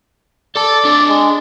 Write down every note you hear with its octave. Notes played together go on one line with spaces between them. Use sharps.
A4 D5 A5
D4 C#5
G#3